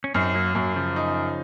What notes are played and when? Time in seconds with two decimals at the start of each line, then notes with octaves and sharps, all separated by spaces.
0.04 C#4
0.14 F#2 C4 D#4
0.35 F#3 A#3
0.55 F#2 F#3 A#3
0.75 C#3 F3
0.96 D#4